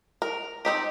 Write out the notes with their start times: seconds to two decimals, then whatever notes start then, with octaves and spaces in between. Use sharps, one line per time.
0.22 A#4
0.65 C4 D#4 G4